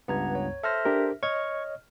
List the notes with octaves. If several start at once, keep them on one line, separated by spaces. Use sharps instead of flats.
C#2 G2 B3 F#5 A#5 G#6
C#5
A4 C5 E5 F6 A#6
D4 G4 A#4
C#5 D#5 C#6 F6 G#6